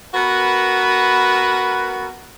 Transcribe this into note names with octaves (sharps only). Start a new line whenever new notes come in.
B3 F#4 A#4 B4